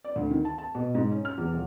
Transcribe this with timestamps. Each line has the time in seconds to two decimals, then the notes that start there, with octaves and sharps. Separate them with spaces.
0.04 D5
0.16 D2
0.31 D#3
0.45 A5
0.58 A5
0.75 B2
0.95 G#2
1.12 C#4
1.25 F6
1.38 E2
1.53 D#1